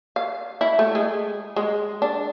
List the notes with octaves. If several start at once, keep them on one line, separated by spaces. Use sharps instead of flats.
F5
E4
A3
G#3
G#3
D4